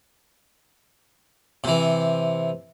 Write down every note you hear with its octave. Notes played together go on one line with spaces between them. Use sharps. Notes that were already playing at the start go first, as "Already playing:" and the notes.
C3 E3